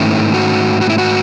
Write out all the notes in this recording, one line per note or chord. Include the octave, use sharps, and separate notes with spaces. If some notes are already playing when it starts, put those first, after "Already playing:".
Already playing: G#2 D#3 A3 C#4 E4
F#4
F#4
E4
F#4